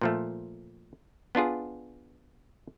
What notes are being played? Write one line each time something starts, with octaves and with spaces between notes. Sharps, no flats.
A#2 F3 A3
B3 D4 F4 G#4